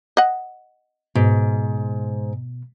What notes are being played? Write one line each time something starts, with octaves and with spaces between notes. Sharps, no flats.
D#5 F#5
G#2 B2